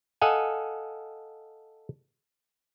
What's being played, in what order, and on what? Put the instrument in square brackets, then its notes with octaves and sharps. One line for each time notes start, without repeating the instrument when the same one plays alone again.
[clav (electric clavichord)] A4 D#5 F5 F#5 G#5